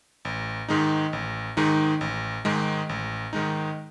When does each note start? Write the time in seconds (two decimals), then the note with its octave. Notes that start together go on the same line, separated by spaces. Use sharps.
0.25 A1
0.69 G#2 D#3 G#3 D#4
1.13 A1
1.57 G#2 D#3 G#3 D#4
2.01 A1
2.45 G#2 D#3 G#3 D#4
2.89 A1
3.33 G#2 D#3 G#3 D#4